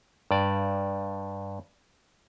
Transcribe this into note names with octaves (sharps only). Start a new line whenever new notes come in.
G2 D5